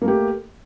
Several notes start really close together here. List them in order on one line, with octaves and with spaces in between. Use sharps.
A#3 A3 G4